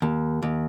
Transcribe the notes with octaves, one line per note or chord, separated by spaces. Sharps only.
D#2
D#2